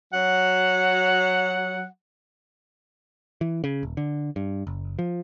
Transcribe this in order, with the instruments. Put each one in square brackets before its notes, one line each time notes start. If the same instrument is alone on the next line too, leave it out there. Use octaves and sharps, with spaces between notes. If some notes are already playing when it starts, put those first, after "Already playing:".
[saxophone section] F#3 F#5
[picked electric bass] E3
C#3
D#1
D3
G2
F#1
F3